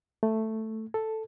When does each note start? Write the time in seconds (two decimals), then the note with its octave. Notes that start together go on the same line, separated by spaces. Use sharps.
0.23 A3
0.94 A4